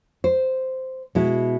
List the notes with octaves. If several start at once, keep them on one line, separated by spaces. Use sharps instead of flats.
C5
B2 G#3 E4